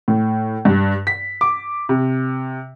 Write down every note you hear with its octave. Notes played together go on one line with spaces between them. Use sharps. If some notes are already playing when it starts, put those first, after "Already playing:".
A2
G2
B6
D6
C3